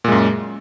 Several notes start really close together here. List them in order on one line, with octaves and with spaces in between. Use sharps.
A#2 G#3 F#2